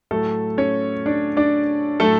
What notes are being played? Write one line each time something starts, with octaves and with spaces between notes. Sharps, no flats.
A2 F#3 A3 A4
C#4 C#5
D4 D5
D4 D5
A2 F#3 A3 A4